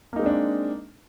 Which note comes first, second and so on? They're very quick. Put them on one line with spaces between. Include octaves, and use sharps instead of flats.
A#3 D#4 G#3 C4 D4